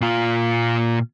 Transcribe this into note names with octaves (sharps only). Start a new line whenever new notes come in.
A#2 F4